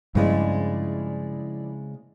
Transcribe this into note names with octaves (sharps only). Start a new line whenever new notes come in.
G2 C#3 F3 G#3 C4 E4 D5